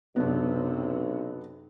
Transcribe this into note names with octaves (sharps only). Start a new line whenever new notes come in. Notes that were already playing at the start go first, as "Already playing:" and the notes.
B1 F#2 C3 B3 D4